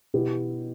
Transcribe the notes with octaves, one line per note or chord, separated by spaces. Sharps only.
B2 B3 E4 G4